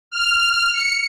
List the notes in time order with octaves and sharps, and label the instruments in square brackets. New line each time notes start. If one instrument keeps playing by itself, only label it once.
[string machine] F6
C#7